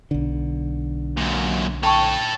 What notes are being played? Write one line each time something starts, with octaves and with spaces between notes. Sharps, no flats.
B1 D3
F#2 A#2
A4 C#5 G5 A5 C#6